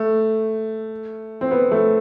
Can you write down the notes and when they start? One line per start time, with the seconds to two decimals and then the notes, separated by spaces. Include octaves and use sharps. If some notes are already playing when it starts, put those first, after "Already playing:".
Already playing: A3
1.41 C4
1.51 B3
1.71 A3